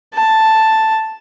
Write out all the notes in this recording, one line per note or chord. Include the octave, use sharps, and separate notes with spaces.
A5